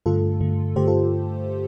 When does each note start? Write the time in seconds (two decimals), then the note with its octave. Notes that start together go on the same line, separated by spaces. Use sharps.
0.06 G2 D3 A3 F4 A4
0.41 G2 D3 A3
0.76 G2 D3 A3 G4 C5
0.87 F4 A4